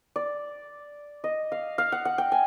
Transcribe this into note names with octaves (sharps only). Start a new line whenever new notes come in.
D5
D#5
F5
F5
F#5
F#5
G5
G#5